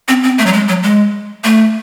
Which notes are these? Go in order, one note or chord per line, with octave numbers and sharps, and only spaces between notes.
C4
C4
A3
F#3
G#3
F#3
G#3
A3